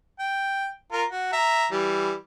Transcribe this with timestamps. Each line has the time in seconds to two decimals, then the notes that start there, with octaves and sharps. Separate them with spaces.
0.19 G5
0.92 F4 A#4
1.09 F#4
1.33 E5 A#5
1.72 E3 G3